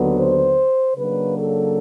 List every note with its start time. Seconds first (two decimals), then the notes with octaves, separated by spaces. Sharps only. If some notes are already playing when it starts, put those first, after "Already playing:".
Already playing: D#2 D3 F#3 B3
0.18 C5
0.97 C#3 F#3 A#3 D4 B4
1.37 A4